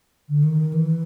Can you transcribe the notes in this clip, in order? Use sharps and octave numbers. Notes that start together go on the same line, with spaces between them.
D3
D#3
E3